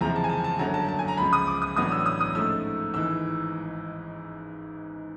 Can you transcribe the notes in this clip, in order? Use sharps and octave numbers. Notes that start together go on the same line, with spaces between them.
F#1 E2 C3 F3 G#3 A#5
A5
G#5
A5
A5
G1 F#2 D3 F#3 A#5
A5
A5
G#5
A#5
C#2 C#3 F3 B5
D#6
D6
D#6
A1 A2 F#3 B3 D4 D#6
E6
D#6
D#6
G#2 F3 A3 C#4 E6
G#1 G#2 E3 E6